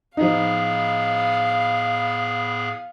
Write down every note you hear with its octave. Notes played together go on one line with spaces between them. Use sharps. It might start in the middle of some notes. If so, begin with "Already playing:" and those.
A2 F3 B3 D#4 G#4 F5